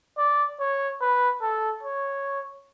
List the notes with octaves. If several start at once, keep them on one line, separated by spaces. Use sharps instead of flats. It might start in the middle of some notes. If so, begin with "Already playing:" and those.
D5
C#5
B4
A4
C#5